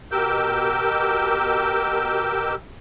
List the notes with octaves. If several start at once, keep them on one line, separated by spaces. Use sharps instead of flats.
B2 G4 A#4 D6 E6 G6